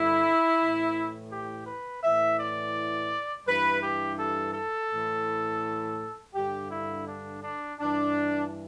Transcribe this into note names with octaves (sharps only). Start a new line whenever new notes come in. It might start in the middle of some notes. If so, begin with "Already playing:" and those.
Already playing: G2 D3 E4
A2 E3
G4
B4
A2 E3 E5
D5
G2 E3 B4
G4
A4
A4
A2 E3
G2 D3 G4
E4
D4
D4
G2 E3 D4